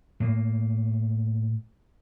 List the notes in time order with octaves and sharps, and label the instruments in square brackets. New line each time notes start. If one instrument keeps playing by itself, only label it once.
[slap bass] A2 A#3